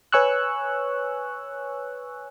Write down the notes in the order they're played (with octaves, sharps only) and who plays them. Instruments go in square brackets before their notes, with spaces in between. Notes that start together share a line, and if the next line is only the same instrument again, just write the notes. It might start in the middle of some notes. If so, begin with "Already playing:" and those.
[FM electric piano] B4 C#5 G#5 C#6 E6 F#6